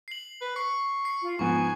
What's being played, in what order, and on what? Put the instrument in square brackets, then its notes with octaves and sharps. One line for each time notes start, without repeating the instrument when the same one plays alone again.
[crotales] C7 F#7
[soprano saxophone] B4
[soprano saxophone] C#6 [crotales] C7
[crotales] C7
[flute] F4
[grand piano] G#2 F3 B3 [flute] G#5 [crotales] C#6